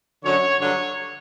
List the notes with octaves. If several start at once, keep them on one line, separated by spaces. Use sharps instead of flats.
F#2 D3 F#3 C#5
G2 D3 F#3 C#5